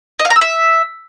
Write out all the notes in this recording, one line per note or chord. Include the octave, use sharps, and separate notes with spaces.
D#5
F5
A#5
E6
E5